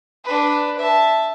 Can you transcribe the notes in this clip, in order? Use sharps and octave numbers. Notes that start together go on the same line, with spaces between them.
D4 B4
E5 A5